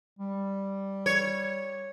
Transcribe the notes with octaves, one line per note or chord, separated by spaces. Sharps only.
G3
C#5